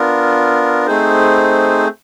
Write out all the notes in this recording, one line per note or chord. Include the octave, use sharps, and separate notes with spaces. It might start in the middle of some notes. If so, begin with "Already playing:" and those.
Already playing: B3 D4 F4 A#4
A3 C4 D#4 G#4 C5